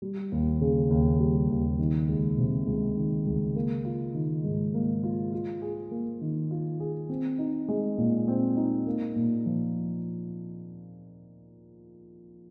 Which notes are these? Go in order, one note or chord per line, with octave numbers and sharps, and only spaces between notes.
G3
D#2
C#3
D#2
G3
D#2
D#3
C#2
C3
C#2
D#3
C#2
A#3
F4
D#3
G#2
A#3
F4
F4
G#4
A#3
D#3
F4
G#4
C4
D#4
G#3
A#2
C4
D#4
A#3
A#2
F3